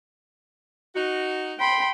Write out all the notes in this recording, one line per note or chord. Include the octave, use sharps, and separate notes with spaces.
D#4 F#4
G5 B5 C6